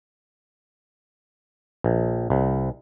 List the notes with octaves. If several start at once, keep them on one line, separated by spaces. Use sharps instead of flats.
A#1
C2